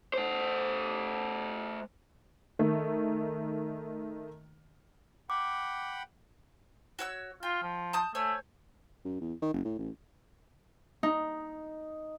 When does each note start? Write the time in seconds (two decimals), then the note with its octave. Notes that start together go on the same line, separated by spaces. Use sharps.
0.14 A3 C5
2.59 D#3 A3
5.30 F#5 G5 B5 D6
6.99 F#4 C#5 E6
7.43 F4 G5
7.62 F3
7.93 A5 D#6 G6
8.15 A3 C5 C#5 G#5
9.05 F#2
9.21 E2
9.41 D#3
9.53 F#1
9.64 A2
9.78 A1
11.03 D#4